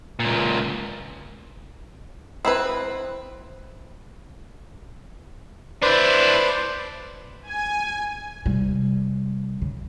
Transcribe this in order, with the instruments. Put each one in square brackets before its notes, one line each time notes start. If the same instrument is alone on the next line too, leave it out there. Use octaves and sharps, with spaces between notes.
[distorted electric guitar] C#2 A#2
[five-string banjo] C4 E4 B4
[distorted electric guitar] D4 E4 [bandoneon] B4 C5 D5
[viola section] G#5
[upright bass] C3 G3
C#3